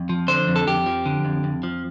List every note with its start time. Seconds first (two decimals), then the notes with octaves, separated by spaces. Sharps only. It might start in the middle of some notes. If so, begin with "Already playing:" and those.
Already playing: F2
0.09 F3
0.28 D3 C5
0.47 F2
0.56 A4
0.67 F2 G4
0.86 F3
1.06 D3
1.25 F2
1.44 F2
1.63 F3